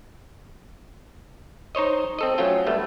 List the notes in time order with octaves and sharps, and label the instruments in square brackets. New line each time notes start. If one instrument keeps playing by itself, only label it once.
[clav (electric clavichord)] D#4 C5 C#5 D#5
C4 A4 D#5
F#3 A3 C#4 F4 G5
G3 A3 B3